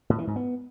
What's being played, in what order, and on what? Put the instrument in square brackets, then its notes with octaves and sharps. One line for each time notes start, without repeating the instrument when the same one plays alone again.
[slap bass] A2
E3
G#2
B3